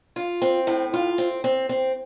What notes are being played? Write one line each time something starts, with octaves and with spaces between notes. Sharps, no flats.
F4
C4
A2
F4
C4
C4
C4